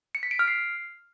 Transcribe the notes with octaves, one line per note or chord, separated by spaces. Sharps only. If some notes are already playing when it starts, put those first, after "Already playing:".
C#7
B6
D7
F6
C7